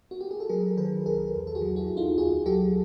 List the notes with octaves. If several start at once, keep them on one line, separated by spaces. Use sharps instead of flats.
F#4
G4
G#4
A4
F#3 G#4 A#4
D#3 A4 B4
C2 G#4 A#4
E2
A4
F#4 G#4
F#3
E4 F#4
E2
D#4 F4
D2 F#4 G#4
F#3 G4 A4